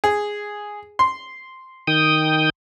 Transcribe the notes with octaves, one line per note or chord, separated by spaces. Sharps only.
G#4
C6
D#3 G5 D#6